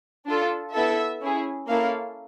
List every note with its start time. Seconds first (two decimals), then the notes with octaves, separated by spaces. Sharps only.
0.26 D4 F4 A4
0.74 B3 E4 A4 E5
1.21 C#4 E4 G#4
1.68 A#3 C#4 E4 A4 F5